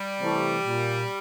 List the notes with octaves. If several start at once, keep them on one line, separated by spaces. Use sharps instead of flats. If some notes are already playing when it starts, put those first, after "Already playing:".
Already playing: G3
C3 E3 A3
A#2